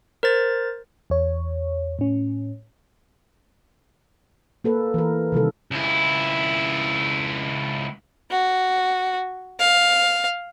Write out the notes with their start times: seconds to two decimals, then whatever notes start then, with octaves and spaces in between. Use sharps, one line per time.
0.23 A#4 C5 A6
1.10 E2 C#5
1.99 A2 C#4
4.64 A#3 A4 B4
4.94 E3 A#4
5.32 C3 D#3 G3 A4
5.71 C#2 E4
8.31 F#4
9.60 F5